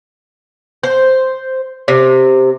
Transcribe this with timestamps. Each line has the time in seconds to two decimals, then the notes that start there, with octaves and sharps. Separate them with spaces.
0.83 C5
1.88 C3